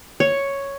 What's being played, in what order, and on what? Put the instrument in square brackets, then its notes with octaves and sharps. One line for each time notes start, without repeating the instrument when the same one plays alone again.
[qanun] C#5